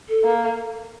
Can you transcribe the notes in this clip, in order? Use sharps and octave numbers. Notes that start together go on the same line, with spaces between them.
A4
A#3